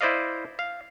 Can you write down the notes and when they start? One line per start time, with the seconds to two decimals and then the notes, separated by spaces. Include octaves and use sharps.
0.01 E4 C5 D5 D#5 F5
0.59 F5